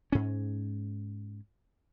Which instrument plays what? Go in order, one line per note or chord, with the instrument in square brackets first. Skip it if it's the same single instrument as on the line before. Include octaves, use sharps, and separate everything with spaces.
[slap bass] G#2 C#4